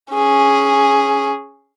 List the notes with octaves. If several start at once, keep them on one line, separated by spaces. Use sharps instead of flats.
C#4 G#4